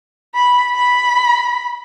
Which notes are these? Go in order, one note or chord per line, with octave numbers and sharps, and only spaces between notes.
B5
B5